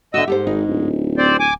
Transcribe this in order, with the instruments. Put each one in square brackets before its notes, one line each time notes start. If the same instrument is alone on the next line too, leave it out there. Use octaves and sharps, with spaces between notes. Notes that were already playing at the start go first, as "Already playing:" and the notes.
[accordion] D3 D#5 E6 [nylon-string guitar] F#4 E5
[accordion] G#2 [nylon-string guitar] G4 A4 C5
[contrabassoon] G#1 [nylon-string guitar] D#4
[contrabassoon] D1
[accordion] C4 C5 D5
G#5 D6